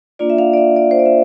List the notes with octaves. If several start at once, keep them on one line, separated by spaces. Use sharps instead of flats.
A#3 D4 F4 D5
E5
F5
D5
E5
D5
C5
D5
E5